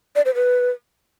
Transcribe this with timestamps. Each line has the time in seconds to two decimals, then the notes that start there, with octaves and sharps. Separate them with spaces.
0.16 D5
0.25 C5
0.35 B4